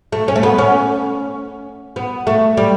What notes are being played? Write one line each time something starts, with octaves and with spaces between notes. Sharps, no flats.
A3
C#4
A3
B3
C#4
B3
A3
G3